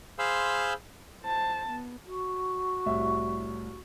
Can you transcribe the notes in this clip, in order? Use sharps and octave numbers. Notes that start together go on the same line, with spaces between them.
G#4 C5 F5 B5 C6 E6
C5 A5
B3
F#4
C2 A2 E5